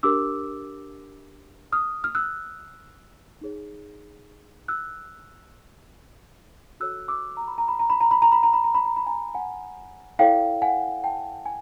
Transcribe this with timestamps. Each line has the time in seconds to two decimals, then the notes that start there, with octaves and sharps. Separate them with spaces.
0.03 D4 G4 A#4 D6 E6
1.72 D#6 F6
2.04 F6
2.15 E6 F#6
3.41 D#4 G#4 C#5
4.68 E6 F#6
6.80 F#4 A4 C#5 E6 F#6
7.08 D6 E6
7.37 A#5
7.48 B5
7.58 A#5
7.68 B5
7.79 A#5
7.90 B5
8.01 A#5
8.11 B5
8.22 A#5
8.32 B5
8.43 A#5
8.53 B5
8.64 A#5
8.75 B5
8.86 A#5
8.96 B5
9.06 G#5 A#5
9.35 F#5 G#5
10.19 E4 A4 C#5 F5 G5
10.62 F#5 G#5
11.04 G5 A5
11.46 G#5